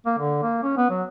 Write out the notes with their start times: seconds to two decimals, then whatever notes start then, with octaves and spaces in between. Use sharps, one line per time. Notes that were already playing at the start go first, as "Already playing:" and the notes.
0.06 A#3
0.18 D3
0.43 A#3
0.63 C#4
0.77 B3
0.90 F#3